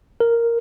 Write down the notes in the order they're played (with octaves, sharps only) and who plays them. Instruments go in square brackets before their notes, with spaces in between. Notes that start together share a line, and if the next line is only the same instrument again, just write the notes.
[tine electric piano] A#4